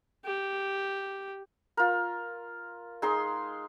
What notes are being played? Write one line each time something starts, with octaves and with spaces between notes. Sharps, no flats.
G4
F4 A#4
G#3 D#4 G#4 C6